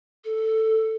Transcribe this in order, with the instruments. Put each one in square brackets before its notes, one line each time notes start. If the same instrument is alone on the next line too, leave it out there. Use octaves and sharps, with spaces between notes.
[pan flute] A4